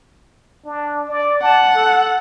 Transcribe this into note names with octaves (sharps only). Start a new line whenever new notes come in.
D4
D5
F#5 A5
A4